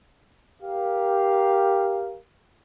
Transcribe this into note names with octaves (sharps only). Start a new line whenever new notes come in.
G4 A#4 F5